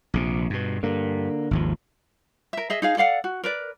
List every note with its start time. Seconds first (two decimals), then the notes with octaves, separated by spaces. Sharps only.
0.14 A#1 C3
0.50 G2 B2
0.83 G2 D3 A#3
1.51 G#1 D#2 F3
2.53 A#4 E5
2.70 G#4 D#5 E5
2.82 D#4 G#4 F5
2.97 A4 D5 F5 F#5
3.24 F#4
3.44 A#4 B4 D5